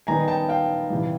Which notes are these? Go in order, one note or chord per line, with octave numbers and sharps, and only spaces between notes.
D#3 G3 B3 D#4 G#5 A#5
G5 A5
F5 G5
C3 E3 G3